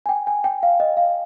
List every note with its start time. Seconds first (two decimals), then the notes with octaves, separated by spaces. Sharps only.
0.06 G#5
0.09 G5
0.27 G#5
0.44 G5
0.63 F5
0.80 D#5
0.97 F5